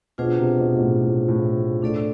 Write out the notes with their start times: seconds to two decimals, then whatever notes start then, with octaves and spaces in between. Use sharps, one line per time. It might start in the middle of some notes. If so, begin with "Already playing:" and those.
0.18 B2 D4 F4 G#4 C5
0.38 C3
0.60 B2
0.76 B2
0.80 A2
1.01 A2
1.28 A2
1.82 A2 D4 A4 D5